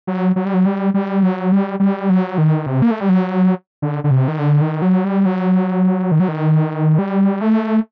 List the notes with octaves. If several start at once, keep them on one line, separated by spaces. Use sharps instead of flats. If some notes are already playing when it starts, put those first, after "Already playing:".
F#3
F#3
G3
F#3
G3
G3
F#3
G3
G3
F#3
D#3
C3
A#3
A3
G3
F#3
D3
D3
C3
D#3
D3
D#3
F#3
G3
F#3
D#3
F#3
D#3
G3
A3